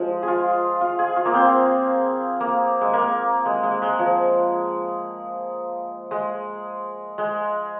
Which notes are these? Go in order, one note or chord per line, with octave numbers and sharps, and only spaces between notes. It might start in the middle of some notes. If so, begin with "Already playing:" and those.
Already playing: F3 G#3
G#4
F4
F4
G#4
F4
A#3
C4
A#3
G#3
A#3
G#3
G#3
G#3
F3
G#3
G#3